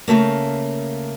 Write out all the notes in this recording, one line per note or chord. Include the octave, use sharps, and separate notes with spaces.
C#3 F3 A3 A#3